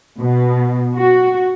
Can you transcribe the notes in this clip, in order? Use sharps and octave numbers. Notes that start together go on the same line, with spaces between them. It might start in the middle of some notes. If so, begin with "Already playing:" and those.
B2
F#4